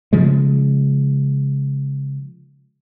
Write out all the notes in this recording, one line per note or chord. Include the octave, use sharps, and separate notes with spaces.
C#3 F3 G#3